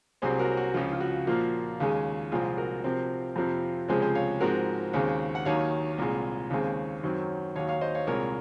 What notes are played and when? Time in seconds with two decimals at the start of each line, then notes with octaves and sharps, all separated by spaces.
0.22 C2 C3 F#3 C4 G#4 C5
0.39 F#4 A#4
0.57 F#4
0.74 C#2 C#3 F3 F4
0.93 F4
1.01 F#4
1.27 A#2 F3 A#3
1.80 D#2 C#3 G#3
2.32 C2 A#2 F3 G#3 C4 F4 G#4
2.57 F#4 A#4
2.84 C3 F3 C4
3.36 F2 C3 F3 C4
3.88 C#2 C3 F3 G#3 G#4 C5
4.02 G#4 C5
4.15 C#5 F5
4.40 G#2 F3 G#3 C4 F#4 A#4
4.93 D#2 C#3 G#3 C4
5.35 F#5
5.46 D#2 D#3 F#3 C#5 F5
5.98 C2 A#2 G#3
6.50 D#2 C#3 G#3 C4
7.03 F#2 D#3 F#3 C4
7.56 D#2 D#3 F#3 C#5 F5
7.69 C#5 F5
7.81 C5 D#5
7.95 C#5 F5
8.07 C2 A#2 G#3 A#4 C#5